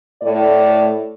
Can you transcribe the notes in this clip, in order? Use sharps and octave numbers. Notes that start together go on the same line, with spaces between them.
A2 A3 D5